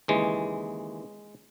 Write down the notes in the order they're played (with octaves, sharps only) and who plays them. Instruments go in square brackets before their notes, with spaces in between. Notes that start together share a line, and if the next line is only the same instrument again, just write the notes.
[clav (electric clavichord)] D#2 C#3 E3 G#3